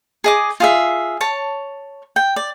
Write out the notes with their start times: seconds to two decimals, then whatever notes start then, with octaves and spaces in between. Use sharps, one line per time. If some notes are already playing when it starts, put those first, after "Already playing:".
0.24 G#4 D#5 D6
0.60 F4 G#4 E5
1.21 C#5 A5
2.16 G5
2.36 D5